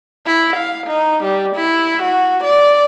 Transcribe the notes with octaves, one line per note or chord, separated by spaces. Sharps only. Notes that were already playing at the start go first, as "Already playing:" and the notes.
E4
F5
D#4
G3
E4
F#4
D5